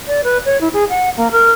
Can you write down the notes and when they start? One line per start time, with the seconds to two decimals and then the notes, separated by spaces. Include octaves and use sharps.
0.07 D5
0.24 B4
0.45 C#5
0.61 E4
0.73 G#4
0.89 F#5
1.17 A#3
1.32 A#4